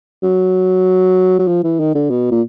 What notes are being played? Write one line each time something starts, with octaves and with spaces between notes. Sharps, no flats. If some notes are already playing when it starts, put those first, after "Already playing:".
F#3
F#3
F3
E3
D#3
D3
B2
A#2